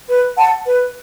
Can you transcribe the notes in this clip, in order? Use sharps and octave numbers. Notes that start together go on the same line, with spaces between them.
B4
F#5 A5
B4